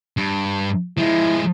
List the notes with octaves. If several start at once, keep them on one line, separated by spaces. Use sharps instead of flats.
G2
F3 G#3 E4